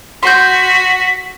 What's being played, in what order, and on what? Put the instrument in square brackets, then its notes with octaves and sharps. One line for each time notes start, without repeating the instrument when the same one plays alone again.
[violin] F#4 [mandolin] C6 G6 [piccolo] B6